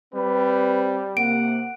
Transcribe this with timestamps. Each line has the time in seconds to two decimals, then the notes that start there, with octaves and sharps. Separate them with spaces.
0.14 G3 C4 B4
1.17 C3 A#3 F#5 D7